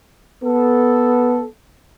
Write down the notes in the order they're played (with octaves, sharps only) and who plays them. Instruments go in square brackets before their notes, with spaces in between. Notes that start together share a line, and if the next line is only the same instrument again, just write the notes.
[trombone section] B3 A4